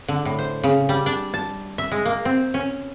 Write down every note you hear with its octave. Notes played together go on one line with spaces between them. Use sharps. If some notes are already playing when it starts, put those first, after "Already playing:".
D3
A2
C5
C#3
G3
D4
A5
E5
G#3
A#3
C4
C#4